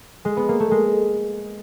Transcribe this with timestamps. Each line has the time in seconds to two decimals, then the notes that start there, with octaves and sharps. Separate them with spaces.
0.25 G#3
0.37 B3
0.49 A#3
0.60 A3
0.71 G#3